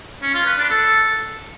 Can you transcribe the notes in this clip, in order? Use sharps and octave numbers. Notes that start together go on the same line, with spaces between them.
C#4
F4
B4
D4
A4